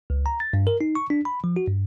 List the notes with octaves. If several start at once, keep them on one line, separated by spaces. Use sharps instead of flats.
C#2
A#5
A6
G2
A#4
D#4
C#6
D4
B5
F3
F#4
G2